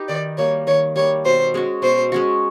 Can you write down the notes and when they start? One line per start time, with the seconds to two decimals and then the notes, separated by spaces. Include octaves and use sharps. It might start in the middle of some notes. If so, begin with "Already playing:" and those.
Already playing: D#4 G4 B4
0.08 D#3 D5
0.38 G3 A#3 C#5
0.67 D#3 C#5
0.96 G3 A#3 C#5
1.25 B2 C5
1.54 G#3 C#4 F#4
1.82 B2 C5
2.12 G#3 C#4 F#4